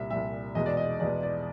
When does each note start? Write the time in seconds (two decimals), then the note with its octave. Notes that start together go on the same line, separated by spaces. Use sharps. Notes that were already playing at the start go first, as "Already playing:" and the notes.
Already playing: C2 A#2 G3 E5
0.11 C2 A#2 G3 E5
0.55 E2 B2 G#3 D#5
0.66 D5
0.77 D#5
1.00 E2 B2 G#3 D5
1.23 D5